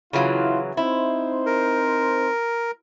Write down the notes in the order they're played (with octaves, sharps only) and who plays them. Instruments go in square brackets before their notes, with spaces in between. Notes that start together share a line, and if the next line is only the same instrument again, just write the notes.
[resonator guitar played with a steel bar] C#3 E3 F#3 [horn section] E4 F4
[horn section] C4 D#4 C5 [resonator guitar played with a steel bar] E4
[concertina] A#4